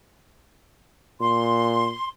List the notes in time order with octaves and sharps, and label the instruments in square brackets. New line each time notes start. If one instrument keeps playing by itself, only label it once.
[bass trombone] A#2 [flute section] C6